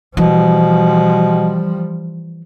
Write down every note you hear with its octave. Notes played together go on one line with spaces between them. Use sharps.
B2 E3 F3 G3